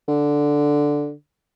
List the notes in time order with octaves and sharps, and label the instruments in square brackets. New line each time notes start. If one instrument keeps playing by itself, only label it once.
[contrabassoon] D3